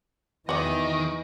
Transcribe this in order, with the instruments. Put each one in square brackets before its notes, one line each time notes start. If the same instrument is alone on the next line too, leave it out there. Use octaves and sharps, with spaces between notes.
[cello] E2 D#5 [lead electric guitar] D#3 [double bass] E3 [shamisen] F#4 D5